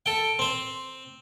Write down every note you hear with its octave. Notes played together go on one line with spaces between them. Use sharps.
A4 G5
C4 C5